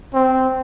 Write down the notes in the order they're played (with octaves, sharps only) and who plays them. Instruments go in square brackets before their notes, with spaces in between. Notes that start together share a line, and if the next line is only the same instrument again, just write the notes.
[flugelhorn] C4